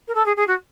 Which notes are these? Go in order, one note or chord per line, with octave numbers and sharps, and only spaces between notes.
A#4
A4
G#4
G#4
F#4